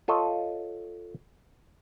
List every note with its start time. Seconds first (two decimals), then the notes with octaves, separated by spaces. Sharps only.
0.08 F4 A4 C#5 D#5